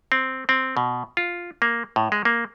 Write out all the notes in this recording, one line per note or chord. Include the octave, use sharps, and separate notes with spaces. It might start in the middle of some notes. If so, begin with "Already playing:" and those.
C4
C4
B2
F4
A#3
A2
G#3
A#3